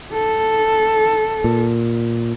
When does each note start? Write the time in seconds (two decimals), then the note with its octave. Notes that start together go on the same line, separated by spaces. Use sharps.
0.13 A4
1.44 A#2